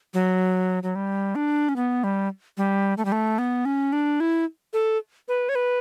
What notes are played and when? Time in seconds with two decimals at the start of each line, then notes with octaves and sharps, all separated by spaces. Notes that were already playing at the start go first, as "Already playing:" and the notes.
0.14 F#3
0.83 F#3
0.95 G3
1.35 D4
1.69 C#4
1.76 B3
2.04 G3
2.57 G3
2.98 A3
3.05 G3
3.12 A3
3.39 B3
3.65 C#4
3.93 D4
4.20 E4
4.73 A4
5.28 B4
5.49 C#5
5.55 B4